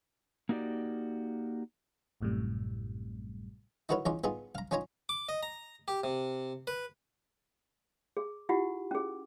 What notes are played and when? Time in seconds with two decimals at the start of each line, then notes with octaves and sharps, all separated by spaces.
0.49 A#3 D#4 F#4 G4 D5
2.21 A1 F#2 A2 C3 G3
3.89 D#4 E4 F#4 A#4 B4 C#5
4.06 E2 C#4 D#4 F4 D6
4.24 B3 D#4 F4 G#4
4.55 F5 A#5
4.71 C#4 D#4 F4 C#5 G#5 A#5
5.09 D6
5.29 D#5
5.43 A#5
5.88 G4
6.04 C3
6.67 B4
8.17 G#4
8.49 E4 F4 G4 F#5
8.91 C#4 G#4